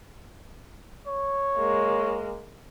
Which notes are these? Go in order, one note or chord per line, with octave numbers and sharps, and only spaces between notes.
C#5
G#3 A#3